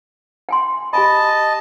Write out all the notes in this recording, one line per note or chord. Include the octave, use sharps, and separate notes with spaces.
G5 G#5 C6
G4 D#5 G#5 A5 B5